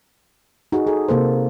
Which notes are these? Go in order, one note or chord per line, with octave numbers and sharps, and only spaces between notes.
D#4 F#4 G#4
G#4 A4
C3 A#3 A4 C5